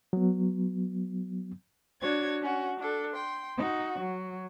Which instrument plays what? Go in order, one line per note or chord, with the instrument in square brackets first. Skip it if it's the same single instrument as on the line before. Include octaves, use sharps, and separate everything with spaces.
[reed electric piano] F#3 B3
[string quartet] D4 F#4 C#5 G#6
C#4 F#4
D4 A4
G5 C6
D#4 F#4
F#3